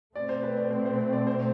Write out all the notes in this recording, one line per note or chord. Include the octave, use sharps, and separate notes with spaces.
B2 A3 C4 D5
C5
B4
D5
C5
C5
C5
D5
C5